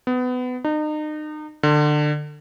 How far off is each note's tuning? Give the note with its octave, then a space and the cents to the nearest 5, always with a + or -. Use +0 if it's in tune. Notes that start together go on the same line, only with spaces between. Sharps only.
B3 +25
D#4 -35
D3 +25